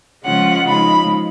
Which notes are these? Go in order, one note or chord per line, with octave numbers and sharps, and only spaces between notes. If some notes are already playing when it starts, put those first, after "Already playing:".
C#3 F3 G#3 C#4 F4 F#5
C#3 F3 G#3 D#4 B5